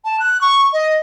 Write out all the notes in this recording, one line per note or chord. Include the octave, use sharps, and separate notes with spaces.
A5
F#6
C#6
D#5